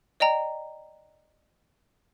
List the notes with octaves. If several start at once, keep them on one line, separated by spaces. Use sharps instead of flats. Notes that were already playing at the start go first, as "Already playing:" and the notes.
D5 D#5 G5 A#5